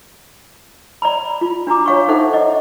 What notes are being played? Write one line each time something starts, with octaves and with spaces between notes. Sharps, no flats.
D5 A#5 B5
F4
D4 F#4 A#5 D6
C#5 F5 C#6
D#4 A4 C5 E5 F#5
D5 D#5